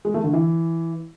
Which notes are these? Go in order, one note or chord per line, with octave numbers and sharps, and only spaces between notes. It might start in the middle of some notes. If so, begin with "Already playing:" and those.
G#3
A3
D3
E3